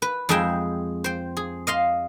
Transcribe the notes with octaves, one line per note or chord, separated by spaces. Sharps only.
B4
F2 G#3 G#4 E5 G5
C5 G5
G#4
D#5 F5 C6